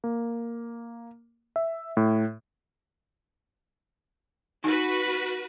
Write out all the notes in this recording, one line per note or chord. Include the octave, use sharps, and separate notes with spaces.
A#3
E5
A2
D#4 F#4 B4 G#5